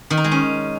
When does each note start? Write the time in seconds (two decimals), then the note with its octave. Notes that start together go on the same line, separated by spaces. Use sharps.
0.10 D#3
0.17 D#4
0.24 G#3
0.31 C#4